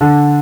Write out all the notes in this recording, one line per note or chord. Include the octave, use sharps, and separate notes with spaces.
D3